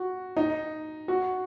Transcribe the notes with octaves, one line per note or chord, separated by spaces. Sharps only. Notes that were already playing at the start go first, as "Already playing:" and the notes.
Already playing: F#4
D#4
F#4